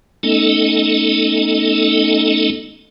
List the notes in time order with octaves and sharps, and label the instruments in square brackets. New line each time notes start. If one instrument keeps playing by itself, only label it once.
[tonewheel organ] A3 B3 C#4 D#4 A4 D#5